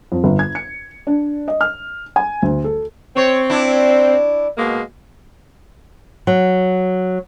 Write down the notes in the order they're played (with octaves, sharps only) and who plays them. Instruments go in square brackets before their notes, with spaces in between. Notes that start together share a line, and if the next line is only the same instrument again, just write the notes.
[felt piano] F2
G1
G#6
C#7
D4
D#5
F6
G#5
D2
A4
[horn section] C4 [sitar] C#5
[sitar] D4 E4
[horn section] B2 G#3 A#3
[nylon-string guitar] F#3